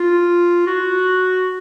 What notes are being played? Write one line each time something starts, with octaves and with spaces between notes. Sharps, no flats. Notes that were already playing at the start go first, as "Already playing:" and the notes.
Already playing: F4
F#4